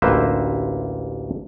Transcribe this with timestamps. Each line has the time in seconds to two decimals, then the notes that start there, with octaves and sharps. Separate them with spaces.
0.02 A1 D2 A#3 B4 C5 E5